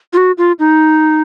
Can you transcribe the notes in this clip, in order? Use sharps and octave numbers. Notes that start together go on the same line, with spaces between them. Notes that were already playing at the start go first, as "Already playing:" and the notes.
F4
F#4
F4
D#4